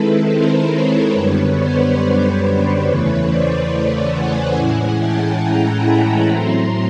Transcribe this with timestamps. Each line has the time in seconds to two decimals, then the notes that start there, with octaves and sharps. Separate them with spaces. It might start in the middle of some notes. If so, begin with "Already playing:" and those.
Already playing: D#3 G#3 C4 E4 A4 B4
0.28 A#4 C5
0.70 B4 C#5
1.13 F#2 D3 G3 B3 B4 C#5
1.56 C5 D5
2.42 B4 C#5
2.84 E2 C#3 E3 A3
3.27 C5 D5
4.13 F#5 G#5
4.55 A2 E3 G#3 C#4 E4
4.98 G5 A5
5.41 G#5 A#5
5.84 A5 B5
6.26 A2 F#3 A3 C4 A#5 C6